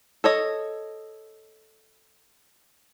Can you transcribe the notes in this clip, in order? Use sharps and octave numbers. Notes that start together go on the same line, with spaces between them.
A4 C#5 D#5